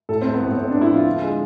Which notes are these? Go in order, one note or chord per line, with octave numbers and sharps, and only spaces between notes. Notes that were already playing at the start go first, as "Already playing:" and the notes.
A2 A4
A3 C4
B3
A2 C4
A2 C4
A2 D4
E4
F3 F4
D3
G#3